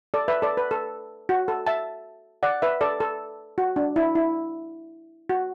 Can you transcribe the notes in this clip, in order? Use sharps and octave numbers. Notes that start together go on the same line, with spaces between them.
A4 D5
B4 E5
A4 D5
B4
A4
F#4
A4
E5 A5
D5 F#5
B4 E5
A4 D5
A4
F#4
D4
E4
E4
F#4